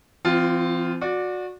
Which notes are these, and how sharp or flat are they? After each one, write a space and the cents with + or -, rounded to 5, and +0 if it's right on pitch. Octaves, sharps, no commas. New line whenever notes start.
E3 +45 C4 -20 F4 +0
F#4 -25 D5 +0